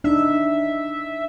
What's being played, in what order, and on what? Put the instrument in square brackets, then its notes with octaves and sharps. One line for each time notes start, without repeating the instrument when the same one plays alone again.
[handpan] D4 D#4 [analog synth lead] E5